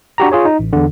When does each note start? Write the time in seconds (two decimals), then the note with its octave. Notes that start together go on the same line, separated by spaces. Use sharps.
0.18 D4 F#4 G4 A#5
0.32 F4 G#4 C#5
0.45 D#4
0.59 A1
0.73 E2 D3